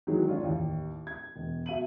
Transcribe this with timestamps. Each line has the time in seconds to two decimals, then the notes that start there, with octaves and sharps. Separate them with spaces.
0.07 D#3 E3 F#3 G#3
0.27 D4 F4 C#5
0.43 A1 D#2
1.07 G#6
1.36 E1
1.66 B2 E5 D#7 F#7